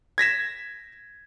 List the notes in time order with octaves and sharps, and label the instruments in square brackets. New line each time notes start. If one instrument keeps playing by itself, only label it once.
[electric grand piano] G#6 A#6 B6 E7